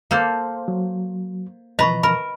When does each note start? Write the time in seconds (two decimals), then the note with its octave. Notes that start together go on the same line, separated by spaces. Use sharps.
0.11 A#3 A4 C5
0.68 F#3
1.79 B2 E3 F3 B4 D#5 A#5 B5 C#6
2.03 A#4 B5